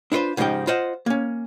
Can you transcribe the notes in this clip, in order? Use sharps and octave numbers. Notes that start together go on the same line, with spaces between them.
D4 E4 F4 B4 C5
G#2 C#3 F3 D#4 G4 G5
F4 C5 D#5 F#5
A#3 C#4